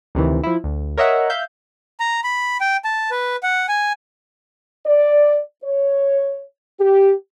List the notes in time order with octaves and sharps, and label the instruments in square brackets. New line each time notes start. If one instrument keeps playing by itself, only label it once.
[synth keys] D2 C3 D#3 E3
F3 E4
D2
A#4 C#5 D#5 E5 F#5
E5 F5 G6
[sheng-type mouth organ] A#5
B5
G5
A5
B4
F#5
G#5
[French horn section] D5
C#5
G4